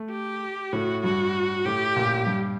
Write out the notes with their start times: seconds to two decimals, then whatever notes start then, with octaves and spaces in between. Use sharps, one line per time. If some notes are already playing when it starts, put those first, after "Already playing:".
Already playing: A3
0.10 G4
0.73 A2 F#4
1.03 G2 F#4
1.65 A2 G4
1.96 A#2
2.26 G2